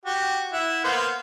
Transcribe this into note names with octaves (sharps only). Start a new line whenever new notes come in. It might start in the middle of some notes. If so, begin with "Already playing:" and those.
F#4 G4
E4 F#5
A#3 B3 C5